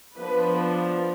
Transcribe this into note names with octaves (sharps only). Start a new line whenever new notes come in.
F3 B3 D4 B4